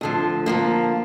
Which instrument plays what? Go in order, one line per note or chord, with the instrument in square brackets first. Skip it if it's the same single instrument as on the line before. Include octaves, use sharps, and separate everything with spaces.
[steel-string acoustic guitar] D2 D3 F3
D3 F3 A#3